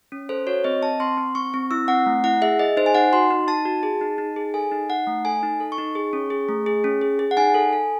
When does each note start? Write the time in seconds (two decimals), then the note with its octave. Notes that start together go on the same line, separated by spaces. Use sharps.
0.12 C#4
0.29 A4 C5
0.47 F#4 C#5
0.64 C4 D#5
0.82 C4 A5
1.00 C4 C6
1.18 C4
1.35 C4 C#6
1.54 C4
1.71 E4 E6
1.88 C4 F#5
2.06 A3
2.24 E4 F#5
2.42 G#4 E5
2.59 G#4 D#5
2.77 D#4 C5
2.86 G#5
2.95 D#4 F#5
3.13 F#4 C6
3.30 D#4
3.48 D#4 A5
3.65 F#4
3.83 G#4
4.01 D#4
4.18 D#4
4.36 G#4
4.54 A4 G#5
4.72 D#4
4.89 D#4 F#5
5.07 A3
5.25 A4 G#5
5.43 D#4
5.60 A4
5.72 C#6
5.78 D#4
5.95 G#4
6.13 C#4
6.30 G#4
6.49 A3
6.66 G#4
6.84 C#4
7.01 G#4
7.19 G#4
7.31 F#5
7.37 D#4 G#5
7.55 A4
7.73 A4